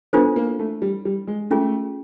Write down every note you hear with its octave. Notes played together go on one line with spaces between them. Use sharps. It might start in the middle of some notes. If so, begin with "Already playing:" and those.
B3 D4 F4 A4 C5
A#3
A3
G3
G3
G#3
A3 C#4 F4 G#4